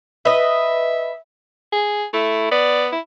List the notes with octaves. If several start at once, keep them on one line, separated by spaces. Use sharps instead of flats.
B4 D#5 E5
G#4
A3 E4
B3 D5
E4